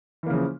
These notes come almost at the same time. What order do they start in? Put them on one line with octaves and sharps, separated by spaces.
E3 A#3 C#3 F3